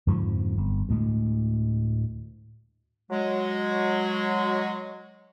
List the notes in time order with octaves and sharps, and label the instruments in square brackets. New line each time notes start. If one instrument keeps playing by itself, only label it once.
[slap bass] F2 G#2 D3 F3
G1
D2 A2 G#3
[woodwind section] F#3 G#3